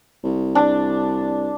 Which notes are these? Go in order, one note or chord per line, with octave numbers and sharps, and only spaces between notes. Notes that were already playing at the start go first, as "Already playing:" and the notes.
C2
D4